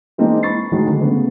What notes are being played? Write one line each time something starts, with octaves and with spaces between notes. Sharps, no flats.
E3 G#3 A#3 C4 D4 D#4
B5 C#6 A6 C7
A2 D#3 F#3 G#3
D3
C#3 A3 B3